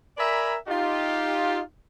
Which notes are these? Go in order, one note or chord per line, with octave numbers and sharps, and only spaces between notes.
A#4 D5 E5 G#5 A#5 B5
D#4 F4 G4